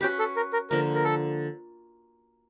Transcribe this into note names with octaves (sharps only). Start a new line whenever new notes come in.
C#4 F#4 G4 B4
A4
A#4
A#4
D3 F3 A#3 A#4
A#4
A4